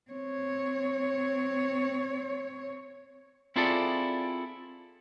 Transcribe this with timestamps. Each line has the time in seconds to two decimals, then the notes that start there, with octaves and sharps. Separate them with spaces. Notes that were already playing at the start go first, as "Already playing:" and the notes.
0.11 C4 C#5
3.56 C4 E4 F4 G#4 A4 D5